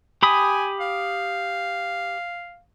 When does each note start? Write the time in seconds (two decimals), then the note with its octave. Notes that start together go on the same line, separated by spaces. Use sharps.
0.23 G4 G#5 B5 D#6
0.80 F5